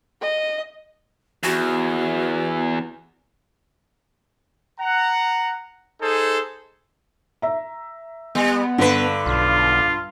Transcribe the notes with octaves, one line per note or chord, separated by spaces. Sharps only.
D#5
E2 F#4
F#5 A#5
D#4 G#4 A4 C5
E5 A#5
G3 B3
G2 D3 B4
B1 F4